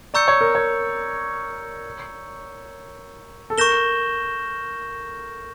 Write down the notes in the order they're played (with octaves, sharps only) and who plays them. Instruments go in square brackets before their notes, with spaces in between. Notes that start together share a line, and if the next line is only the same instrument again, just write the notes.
[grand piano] D5 [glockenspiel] A#5 C#6 E6 G6 C#7
[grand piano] C#5
A#4
C#5
A4
[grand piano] A#4 [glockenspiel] C#6 G6 A#6 E7 G7